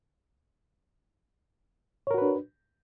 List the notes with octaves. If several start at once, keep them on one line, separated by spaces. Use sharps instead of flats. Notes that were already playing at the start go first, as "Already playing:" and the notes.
D4 F#4 A#4 B4 C#5